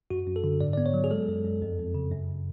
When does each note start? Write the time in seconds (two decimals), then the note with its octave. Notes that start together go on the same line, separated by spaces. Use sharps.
0.10 F#2 F#4
0.27 F#2
0.36 A4
0.44 D3
0.61 G#2 D5
0.73 D5
0.77 B3
0.86 C#5
0.94 F#3
1.04 G#4
1.10 G#3 A4
1.28 F#2
1.45 F#2
1.62 F2
1.79 F2
1.95 C#3
2.12 F#2